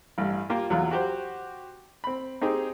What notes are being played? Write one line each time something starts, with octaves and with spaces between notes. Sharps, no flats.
A1 G2
A#3 F4 G4
E2 F#3 F4
F#4 G4 C5
C4 B5
C4 D#4 G4 G#4